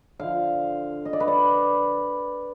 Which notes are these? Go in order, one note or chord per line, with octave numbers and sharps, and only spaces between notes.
D3 F3 F5
D#5
D5
B4
D5